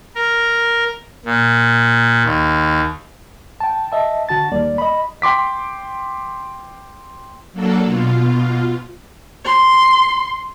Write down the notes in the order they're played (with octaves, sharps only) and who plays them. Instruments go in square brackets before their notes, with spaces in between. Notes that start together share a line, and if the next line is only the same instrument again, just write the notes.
[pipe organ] A#4
A#2
D#2
[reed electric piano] G5 A5
D#5 E5 A5
D3 F#4 A5 A6
D#2 G3 A#3 D5
D#5 B5
[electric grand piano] G5 C6 D6 B6
[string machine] F#3 A#3 D4 A4
B2 F4
[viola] C6